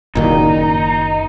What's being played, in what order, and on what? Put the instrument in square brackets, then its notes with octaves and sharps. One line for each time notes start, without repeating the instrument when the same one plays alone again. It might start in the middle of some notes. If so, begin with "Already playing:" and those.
[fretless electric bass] F#1 A#2 D#3 [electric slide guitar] D#4